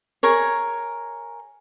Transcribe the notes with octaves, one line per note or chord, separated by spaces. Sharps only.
G#4 A#4 C#5